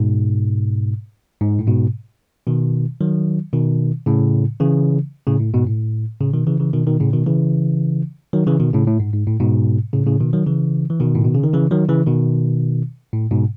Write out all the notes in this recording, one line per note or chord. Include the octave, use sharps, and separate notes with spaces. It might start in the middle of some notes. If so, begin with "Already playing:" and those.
Already playing: G#2 B2
G#2
A2
G#2 B2
B2 D#3
D#3 F#3
B2 D#3
A2 C#3
C#3 E3
A2 C#3
A2
G#2 B2
A2
A2 C#3
B2 D#3
C#3 E3
C#3 E3
B2 D#3
B2 D#3
A2 C#3
B2 D#3
C#3 E3
D#3 F#3
C#3 E3
B2 D#3
A2 C#3
A2
G#2
G#2
A2
G#2 B2
A2 C#3
A2 C#3
B2 D#3
D#3 F#3
C#3 E3
E3
B2 D#3
A2
B2
C#3
D#3
C#3 E3
D#3 F#3
C#3 E3
B2 D#3
A2
G#2 B2